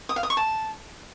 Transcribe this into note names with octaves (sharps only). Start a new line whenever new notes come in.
D#6
F5
D#6
C#6
A5